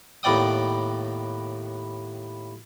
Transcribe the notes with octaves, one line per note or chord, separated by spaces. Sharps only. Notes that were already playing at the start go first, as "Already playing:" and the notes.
D#2 A2 B3 D5 G5 D#6